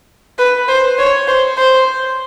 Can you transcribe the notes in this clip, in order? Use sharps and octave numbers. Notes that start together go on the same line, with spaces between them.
B4
C5
C#5
C5
C5